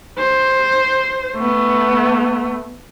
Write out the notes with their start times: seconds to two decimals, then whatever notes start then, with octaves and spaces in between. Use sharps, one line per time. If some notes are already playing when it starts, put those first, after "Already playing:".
0.18 C5
1.36 A3 B3